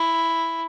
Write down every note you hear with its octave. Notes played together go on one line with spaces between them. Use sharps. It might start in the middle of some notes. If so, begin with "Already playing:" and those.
Already playing: E4